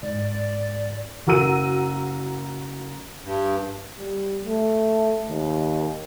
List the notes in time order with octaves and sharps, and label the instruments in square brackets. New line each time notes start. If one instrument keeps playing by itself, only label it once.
[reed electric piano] G#2 [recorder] D5
[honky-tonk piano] F#1 F#4 A#4 E6 D#7
[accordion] G2
[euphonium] G3
A3
D#2